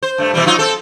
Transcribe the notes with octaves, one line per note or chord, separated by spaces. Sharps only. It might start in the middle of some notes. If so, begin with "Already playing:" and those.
C5
G2 A3
B2 E3 G3
F#3 D#4 F4
C4 A4